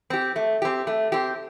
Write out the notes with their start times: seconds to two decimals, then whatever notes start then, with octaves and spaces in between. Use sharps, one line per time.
0.10 C4 G4
0.36 A3
0.62 C4 G4
0.87 A3
1.12 C4 G4